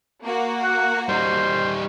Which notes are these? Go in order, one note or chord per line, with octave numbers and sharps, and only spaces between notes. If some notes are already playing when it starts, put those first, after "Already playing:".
A#3 F#4
F#5
G3 D#4 C5